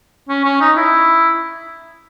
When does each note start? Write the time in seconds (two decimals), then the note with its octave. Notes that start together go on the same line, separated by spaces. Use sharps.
0.29 C#4
0.45 C#4
0.61 D#4
0.77 E4